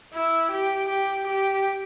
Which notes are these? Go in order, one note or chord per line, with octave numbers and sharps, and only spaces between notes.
E4
G4
G4
G4